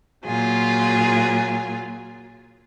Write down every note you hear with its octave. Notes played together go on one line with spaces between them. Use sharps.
A#2 F#3 F4 G#4